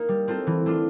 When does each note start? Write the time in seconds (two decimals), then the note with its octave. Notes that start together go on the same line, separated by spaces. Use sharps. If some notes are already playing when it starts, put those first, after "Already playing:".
Already playing: A#3 D#4
0.09 G3
0.28 C4 F4 A4
0.47 E3
0.66 A3 D4 F4